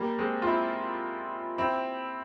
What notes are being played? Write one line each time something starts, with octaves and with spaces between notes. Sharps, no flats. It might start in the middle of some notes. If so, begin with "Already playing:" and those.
Already playing: G3 A#3
G#3 C4
F4
C4 E4
C4 E4